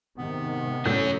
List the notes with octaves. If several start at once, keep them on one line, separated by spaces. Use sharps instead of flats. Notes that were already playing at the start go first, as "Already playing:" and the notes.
G#2 C3 D#3 B3
A2 F#3 C#4 G6